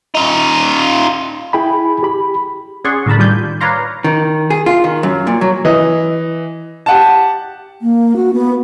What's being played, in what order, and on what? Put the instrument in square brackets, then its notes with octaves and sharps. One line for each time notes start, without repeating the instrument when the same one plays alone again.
[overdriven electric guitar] D#4 F4
[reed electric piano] E4 G#4 G5 G#5 B5
G4 B5
[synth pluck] C#4 G#4 D5 F#5 C6 C#6
A2 D3 A#4 A5 B5
D#3 G3 F4 D5 G#5 G6
B4 C#5 D5 F5 A#5 C6
[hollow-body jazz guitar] D#3
G#4
F4
D#3
F#2
A#2
F#3
[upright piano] E3 D#5
G4 F#5 A5
[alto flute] A#3
F#4
B3